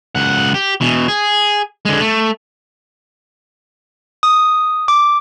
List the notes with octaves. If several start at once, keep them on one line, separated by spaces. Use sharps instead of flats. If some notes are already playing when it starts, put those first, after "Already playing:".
C#2 F#5
G4
B2 E3
G#4
D3 G#3
A3
D#6
D6